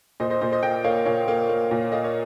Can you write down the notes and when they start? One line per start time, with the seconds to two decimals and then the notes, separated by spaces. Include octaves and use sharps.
0.20 A#2 C5 D#5
0.30 C5 D#5
0.41 A#2 C5
0.52 C5 D#5
0.63 A#3 D#5 G5
0.84 A#3 C#5 F5
1.05 A#2 C#5 F5
1.28 A#3
1.49 A#3
1.71 A#2
1.92 A#3 D#5
2.04 C#5